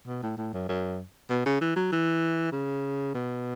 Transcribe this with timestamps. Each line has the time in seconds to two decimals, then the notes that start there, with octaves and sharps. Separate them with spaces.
0.07 B2
0.23 A2
0.37 A2
0.53 F#2
0.69 F#2
1.29 B2
1.46 C#3
1.61 E3
1.76 F#3
1.92 E3
2.52 C#3
3.14 B2